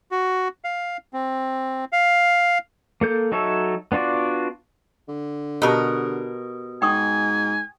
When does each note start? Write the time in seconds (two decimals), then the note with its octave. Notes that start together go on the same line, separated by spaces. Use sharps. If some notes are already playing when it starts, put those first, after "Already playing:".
0.11 F#4
0.64 F5
1.13 C4
1.92 F5
3.01 A#3 A4 G6
3.32 F#3 D#4 A4 C#5 E5
3.92 B3 D4 F4 F#4 D5
5.08 D3
5.62 B2 G4 A4 A#4 A5
6.82 G#2 G5 G#5 C#6 D#6